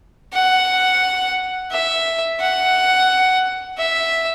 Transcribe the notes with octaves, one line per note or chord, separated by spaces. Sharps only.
F#5
E5
F#5
E5